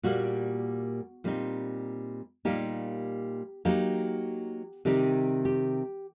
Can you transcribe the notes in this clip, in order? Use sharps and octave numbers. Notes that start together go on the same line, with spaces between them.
A#2 G3 A#3 F#4
A#2 G3 C4 D#4
A#2 G3 A#3 D#4 G4
F#3 A#3 D#4 G4
C3 D#3 G3 C4 D#4 G4
G4